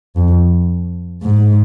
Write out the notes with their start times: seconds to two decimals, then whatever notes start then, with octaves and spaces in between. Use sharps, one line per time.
0.17 F2
1.23 G#2